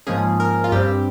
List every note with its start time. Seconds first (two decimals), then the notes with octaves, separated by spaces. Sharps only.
0.07 G#2 F3 A#3 C#4 G#4
0.40 A#4
0.64 F4
0.72 G2 G3 C4 G4